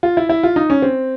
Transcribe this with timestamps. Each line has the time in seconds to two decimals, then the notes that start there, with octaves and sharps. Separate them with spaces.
0.03 F4
0.17 E4
0.29 E4
0.43 F4
0.56 D#4
0.70 C#4
0.82 C4